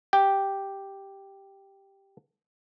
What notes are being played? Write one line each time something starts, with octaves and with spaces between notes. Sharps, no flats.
G4 G5